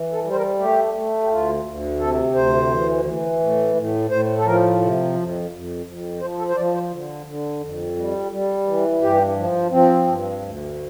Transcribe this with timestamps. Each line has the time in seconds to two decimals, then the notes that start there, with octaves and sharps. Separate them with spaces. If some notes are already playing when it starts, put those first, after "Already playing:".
Already playing: E3
0.12 A4
0.24 G3
0.31 C5
0.36 A#4
0.59 A3 G4
0.94 A3
1.23 G4
1.29 D2 F4
1.64 D2
1.99 C3 A4
2.35 D2 C5
2.70 E3
3.05 E3
3.40 A2
3.75 A2
4.10 A2 C5
4.38 A4
4.45 F3 A#4
4.80 C3
5.15 F2
5.51 F2
5.86 F2
6.21 F3 C5
6.38 A4
6.49 C5
6.56 F3 D5
6.74 C5
6.91 D3
7.26 D3
7.61 F2
7.97 G3
8.32 G3
8.67 E3
9.02 G2 G4
9.37 F3
9.71 F3 C4
10.07 G2
10.42 D2